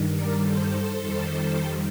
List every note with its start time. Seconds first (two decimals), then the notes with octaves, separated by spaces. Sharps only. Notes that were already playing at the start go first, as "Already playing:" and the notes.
Already playing: G2 D#3 G3
0.12 A#4 D5
0.42 A4 C5
1.01 F2 D#3 G3